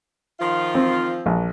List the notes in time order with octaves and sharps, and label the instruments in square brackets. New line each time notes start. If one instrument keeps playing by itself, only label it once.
[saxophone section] D#3 F3 F4
[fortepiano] C4
A#1